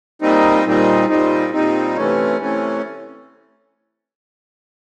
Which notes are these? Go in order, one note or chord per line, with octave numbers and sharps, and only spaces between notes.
A#2 G3 C4 D#4
A#2 G3 C4 D#4
A#2 G3 C4 D#4
A#2 G3 C4 D#4
C3 E3 A3 C#4
C3 E3 A3 C#4